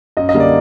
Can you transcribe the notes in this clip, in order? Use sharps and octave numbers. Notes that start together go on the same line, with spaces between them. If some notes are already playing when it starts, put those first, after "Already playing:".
F#2 D#5
D#5
D3 G3 A#3
D5